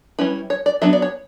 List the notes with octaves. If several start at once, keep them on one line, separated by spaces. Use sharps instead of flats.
G3 C#4 E4 B4
C#5
D5
F#3 B3 D4 E5
D5
C#5